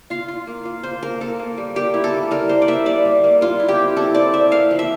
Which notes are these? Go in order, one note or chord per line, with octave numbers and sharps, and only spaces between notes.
F4 F5
F4
A#3
F4
F4 C5
A#3 A#4
A#3 A4
A#3
G3
A#3 G4
E4
A4
A#3
G3 A#4
A#3 C5
D5
A#3 E5
G3 D5
G3
A#3
G3 F4
E4
G4
C4
E4 A4
C4 D5
C4 E5
A#3 F5
F3
E5